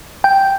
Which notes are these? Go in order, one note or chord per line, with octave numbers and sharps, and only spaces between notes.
G5